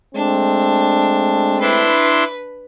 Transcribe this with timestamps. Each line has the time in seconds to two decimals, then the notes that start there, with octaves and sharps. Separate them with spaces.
0.15 G#3 A3 C4 D4
1.61 D4 E4 B4 C6